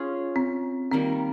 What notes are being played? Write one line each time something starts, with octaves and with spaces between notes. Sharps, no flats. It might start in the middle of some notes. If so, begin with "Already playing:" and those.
Already playing: C#4 F4 G#4
C4
D#3 G3 A#3 C4